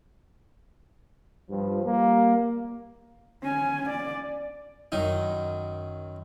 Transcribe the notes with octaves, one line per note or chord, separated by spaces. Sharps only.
G2 F3
G3 A#3
C#4 G#5
D5
F#2 D#3 D#4